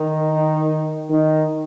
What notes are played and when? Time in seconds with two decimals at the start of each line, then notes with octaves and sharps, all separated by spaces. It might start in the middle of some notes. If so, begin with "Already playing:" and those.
Already playing: D#3 D#4
1.10 D#3 D#4